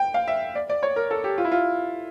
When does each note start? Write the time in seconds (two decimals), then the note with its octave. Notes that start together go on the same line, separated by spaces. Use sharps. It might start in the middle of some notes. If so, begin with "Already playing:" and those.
Already playing: G5
0.14 F5
0.28 E5
0.55 D5
0.69 D5
0.83 C#5
0.96 A#4
1.11 A4
1.24 G4
1.38 F4
1.44 E4
1.52 F4